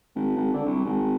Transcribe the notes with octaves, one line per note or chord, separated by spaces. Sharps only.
G#1
G#1
D3
C2
G#1